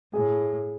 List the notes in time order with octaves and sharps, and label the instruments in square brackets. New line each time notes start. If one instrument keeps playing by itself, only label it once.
[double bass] A2 [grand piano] G#4